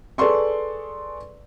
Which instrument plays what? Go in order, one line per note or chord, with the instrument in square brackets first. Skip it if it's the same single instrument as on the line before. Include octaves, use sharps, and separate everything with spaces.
[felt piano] G#4 A4 B4 D5 C6 C#6